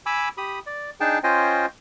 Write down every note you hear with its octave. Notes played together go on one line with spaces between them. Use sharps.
G#5 B5 D6 E6
G4 B5 D#6
D5
D4 D#4 G#4 G5 A5
C#4 F4 C5 D#5 G5 G#5